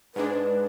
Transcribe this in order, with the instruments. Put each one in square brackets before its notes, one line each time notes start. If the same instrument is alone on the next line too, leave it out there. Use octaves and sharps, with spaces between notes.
[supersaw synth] G#2 G#3 D4 [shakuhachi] B4